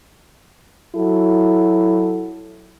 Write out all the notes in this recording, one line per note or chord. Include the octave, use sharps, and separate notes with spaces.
F#3 E4 F#4 A4